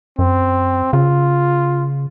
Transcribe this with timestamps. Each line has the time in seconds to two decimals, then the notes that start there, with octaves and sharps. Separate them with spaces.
0.19 F#2 C4
0.93 C#3 F4